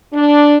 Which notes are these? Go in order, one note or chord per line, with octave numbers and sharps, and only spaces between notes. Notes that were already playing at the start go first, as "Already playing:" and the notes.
D4